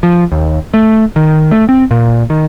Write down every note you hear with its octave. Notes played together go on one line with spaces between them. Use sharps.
F3
D#2
A3
D#3
A3
C4
A#2
D#3